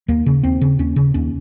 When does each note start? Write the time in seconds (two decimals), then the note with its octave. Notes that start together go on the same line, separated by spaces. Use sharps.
0.08 D#2 A#3
0.26 C#3
0.43 D#2 C4
0.61 C#3
0.79 D#2 C#4
0.96 C#3
1.14 D#2 C#4